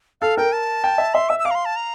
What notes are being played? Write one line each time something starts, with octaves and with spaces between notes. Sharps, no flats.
A4 F5
A#4 G5
A5
G5
E5
E5 C6
E5 E6
E6
F5 D6
A#5
C6
A5
A#5